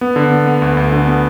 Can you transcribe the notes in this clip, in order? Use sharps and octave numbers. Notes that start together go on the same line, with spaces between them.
B3
D3
B3
B3
D2
D2
D3
B3